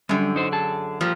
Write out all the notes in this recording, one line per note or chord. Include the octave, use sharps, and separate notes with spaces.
F#2 D3 G3
D#4 C5
G#4 A5
A#2 F3 G3